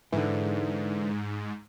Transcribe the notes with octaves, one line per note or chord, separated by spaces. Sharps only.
G#2 D3 E3